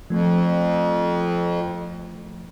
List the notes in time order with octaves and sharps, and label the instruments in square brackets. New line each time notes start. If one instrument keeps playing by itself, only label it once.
[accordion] F2 [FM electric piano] F3 A3